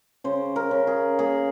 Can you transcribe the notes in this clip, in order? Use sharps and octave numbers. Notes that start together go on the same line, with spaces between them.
C#3 C5
A#4
C#3
G#4
A#3 G#4